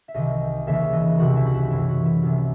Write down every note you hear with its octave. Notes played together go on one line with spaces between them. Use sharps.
E5
C2 C3 D#3 D#5
D#2 C#3 E3 E5
D#5
C2 C3 D#3 F#4
E4
F#4
E4
F#2 E3 E4
F#4
E4
C2 C3 D#3 E4